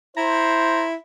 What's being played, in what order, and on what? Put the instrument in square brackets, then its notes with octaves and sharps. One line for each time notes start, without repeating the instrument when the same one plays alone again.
[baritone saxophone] E4 [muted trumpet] C5 [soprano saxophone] A#5